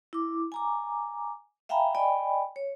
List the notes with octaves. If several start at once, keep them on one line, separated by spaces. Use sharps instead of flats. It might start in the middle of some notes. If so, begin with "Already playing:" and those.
E4 D6
G#5 A#5 D6
E5 F5 G5 G#5 A#5 B5
D5 D#5 G5 G#5 B5
C#5